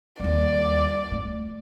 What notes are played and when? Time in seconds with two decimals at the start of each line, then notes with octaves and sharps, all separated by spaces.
0.20 D#2 G3 D5
1.12 A3